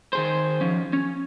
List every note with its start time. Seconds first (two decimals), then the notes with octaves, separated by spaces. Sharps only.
0.13 D#3 G#4 C5
0.61 F3 C#4
0.93 C#4